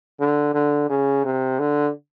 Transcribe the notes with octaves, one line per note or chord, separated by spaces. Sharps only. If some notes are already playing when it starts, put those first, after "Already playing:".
D3
D3
C#3
C3
D3